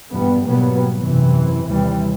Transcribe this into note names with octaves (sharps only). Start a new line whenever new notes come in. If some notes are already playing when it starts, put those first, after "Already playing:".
A#1 E2 G2 G3 B3
G#1 B2 F#3 G3 A#3 B3
F#2 C3 E3
D#2 C3 E3 G3